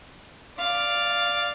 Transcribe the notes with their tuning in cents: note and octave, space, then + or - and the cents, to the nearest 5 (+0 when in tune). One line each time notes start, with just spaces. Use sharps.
D5 +0 F5 +0